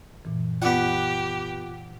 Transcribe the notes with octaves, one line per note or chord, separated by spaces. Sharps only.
F#2 A#2 E3
B3 F4 G4 D5 F#5 D6 F#6